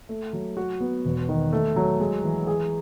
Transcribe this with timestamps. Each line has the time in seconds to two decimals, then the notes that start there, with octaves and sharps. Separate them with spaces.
0.09 A3
0.33 F#3
0.57 F#4
0.80 B3
1.05 E1
1.29 D#3
1.53 A3
1.76 F#3
2.00 G#3
2.24 E3
2.47 G#4